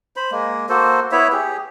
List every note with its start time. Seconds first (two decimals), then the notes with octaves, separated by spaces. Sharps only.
0.16 C5 B5
0.31 G#3 A#3
0.69 A#3 F#4 A4 C5
1.12 B3 E4 C#5 E5
1.32 G4 G#4